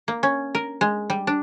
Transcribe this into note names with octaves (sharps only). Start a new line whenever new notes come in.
A#3
C#4
A#4
G#3
G3
D4